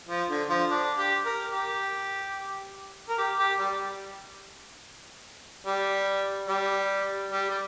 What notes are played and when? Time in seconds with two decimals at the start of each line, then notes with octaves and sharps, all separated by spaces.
0.09 F3
0.29 D3
0.50 F3
0.71 D4
0.98 G4
1.26 A#4
1.52 G4
3.09 A#4
3.18 G4
3.39 G4
3.59 G3
5.66 G3
6.48 G3
7.31 G3
7.50 G3